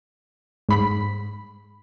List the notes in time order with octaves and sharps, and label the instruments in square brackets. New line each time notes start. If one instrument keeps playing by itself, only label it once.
[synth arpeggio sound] G#2 B5 B6